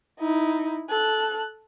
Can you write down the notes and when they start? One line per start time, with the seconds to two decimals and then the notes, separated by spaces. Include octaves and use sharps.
0.20 D#4 E4
0.90 A4 F#6